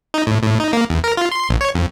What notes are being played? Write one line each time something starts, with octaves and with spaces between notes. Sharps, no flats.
D#4
A2
A2
D#4
A#3
E2
A#4
F4
C6
A#1
C#5
F2